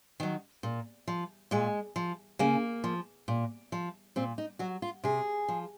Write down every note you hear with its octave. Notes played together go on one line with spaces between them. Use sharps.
D#3 F#3
A#2
F3
A#2 G#3
F3
C#3 A#3
F3
A#2
F3
A#2 C4
D#4
F#3 F#4
F4
C3 G#4
F3